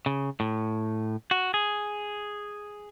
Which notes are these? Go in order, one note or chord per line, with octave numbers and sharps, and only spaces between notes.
C#3
A2
F#4
G#4